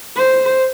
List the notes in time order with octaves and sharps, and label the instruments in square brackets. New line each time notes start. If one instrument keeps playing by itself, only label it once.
[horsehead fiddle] C5